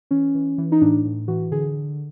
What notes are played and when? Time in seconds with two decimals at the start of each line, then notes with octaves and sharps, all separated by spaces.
0.11 E3 C#4
0.34 E3
0.58 E3
0.72 D#4
0.81 A2 D4
1.05 A2
1.28 E3 F#4
1.52 D3 G#4